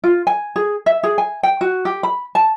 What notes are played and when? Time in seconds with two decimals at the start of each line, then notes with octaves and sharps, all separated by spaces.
0.04 F4
0.27 G#5
0.56 G#4
0.86 E5
1.03 G#4
1.18 G#5
1.43 G5
1.61 F#4
1.85 G4
2.03 B5
2.35 A5